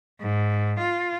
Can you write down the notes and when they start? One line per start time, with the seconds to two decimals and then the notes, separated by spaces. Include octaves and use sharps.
0.21 G#2
0.79 F4